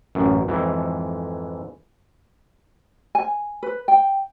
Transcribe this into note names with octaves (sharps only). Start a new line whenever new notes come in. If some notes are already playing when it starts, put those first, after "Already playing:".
A1 F#2
F2 G#2 E3
G#5
B4
G5